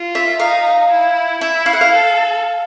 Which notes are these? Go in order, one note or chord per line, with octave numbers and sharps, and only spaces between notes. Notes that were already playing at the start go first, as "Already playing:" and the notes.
Already playing: F4
E5
D#4 F5
E4
E4 E5
F5
F#5
F5
A4